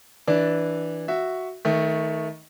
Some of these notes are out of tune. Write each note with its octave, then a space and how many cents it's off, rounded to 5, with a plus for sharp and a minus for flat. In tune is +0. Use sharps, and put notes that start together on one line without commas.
E3 -10 D4 +0 D5 +0
F#4 +0 E5 +0
D#3 +25 A3 +0